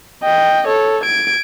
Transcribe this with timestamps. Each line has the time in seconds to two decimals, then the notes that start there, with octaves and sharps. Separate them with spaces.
0.23 D#5 G5
0.67 A4 C#5
1.04 G#6 D7